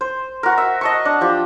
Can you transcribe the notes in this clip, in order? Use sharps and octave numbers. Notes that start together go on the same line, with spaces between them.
C5
F#4 A#4
E5
D#5 A5 C#6
D4
F3 G4